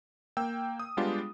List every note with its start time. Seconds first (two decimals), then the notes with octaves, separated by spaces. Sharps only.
0.37 A#3 G5 E6
0.80 D#6
0.97 G3 G#3 B3 D4 F4 G4